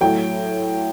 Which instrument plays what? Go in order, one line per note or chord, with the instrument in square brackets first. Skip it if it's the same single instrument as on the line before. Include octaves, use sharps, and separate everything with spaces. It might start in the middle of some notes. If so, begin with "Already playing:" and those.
[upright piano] A2 F#3 G5